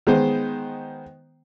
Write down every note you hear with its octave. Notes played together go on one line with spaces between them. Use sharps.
D#3 G#3 B3 C5